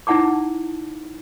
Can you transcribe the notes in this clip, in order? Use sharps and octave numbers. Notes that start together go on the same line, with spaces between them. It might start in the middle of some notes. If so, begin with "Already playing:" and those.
D#4 E4 F#5 A5 D6